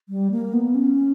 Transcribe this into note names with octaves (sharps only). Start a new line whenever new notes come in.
G3
A#3
B3
C#4